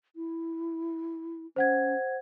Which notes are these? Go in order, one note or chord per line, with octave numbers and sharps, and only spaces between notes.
E4
C#4 C5 F#5 G#6